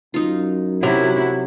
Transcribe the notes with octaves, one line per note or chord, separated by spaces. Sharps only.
F#2 D#4 F4
C3 F#3 E4 F#4 A#4